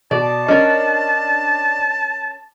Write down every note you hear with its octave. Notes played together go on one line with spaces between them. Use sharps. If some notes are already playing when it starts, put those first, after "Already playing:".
B2 D5 A5
C#4 D4 A#4 D#5 A6